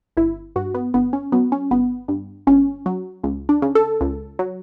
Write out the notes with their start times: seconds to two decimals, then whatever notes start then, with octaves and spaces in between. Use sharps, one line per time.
0.17 G1 E4
0.56 G2 F#4
0.74 B3
0.94 G1 B3
1.13 C#4
1.32 F#3 B3
1.52 C#4
1.71 G1 B3
2.08 G2
2.47 G1 C#4
2.86 F#3
3.24 C#2
3.49 D4
3.62 C#3
3.75 A4
4.01 C#2
4.39 F#3